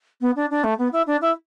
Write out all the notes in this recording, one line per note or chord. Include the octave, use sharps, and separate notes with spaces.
B3
D4
D4
A3
B3
E4
D4
E4